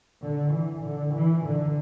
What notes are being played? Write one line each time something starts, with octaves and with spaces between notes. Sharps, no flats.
D3
E3
D3
E3
D3